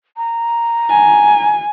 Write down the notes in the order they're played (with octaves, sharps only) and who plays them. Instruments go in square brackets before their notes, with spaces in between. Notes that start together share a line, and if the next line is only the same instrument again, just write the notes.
[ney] A#5
[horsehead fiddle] G#5